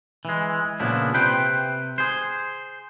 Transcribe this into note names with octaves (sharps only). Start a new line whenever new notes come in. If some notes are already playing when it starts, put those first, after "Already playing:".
E3 G#3
A#2 C#3 F3 B3 D4 E4
C3 B4 C5 G5
G#4 C5